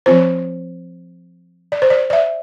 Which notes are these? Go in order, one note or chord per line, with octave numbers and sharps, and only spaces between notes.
F3 C4 F4 C5
D5
C5
D5
D5
E5